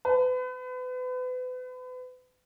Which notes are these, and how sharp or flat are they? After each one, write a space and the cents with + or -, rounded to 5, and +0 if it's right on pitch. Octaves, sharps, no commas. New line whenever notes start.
B4 +35